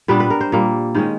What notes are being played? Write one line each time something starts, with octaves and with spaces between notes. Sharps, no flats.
A#2 G3 B3 D4 B4
B4
A#4
C5
A#2 G3 A#3
D#3 G#3 C#4 C5